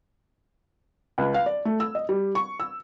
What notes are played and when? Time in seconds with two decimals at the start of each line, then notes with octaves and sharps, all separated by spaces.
1.18 C#2
1.34 F5
1.46 D5
1.65 A3
1.80 E6
1.95 D#5
2.09 G3
2.35 C#6
2.60 E6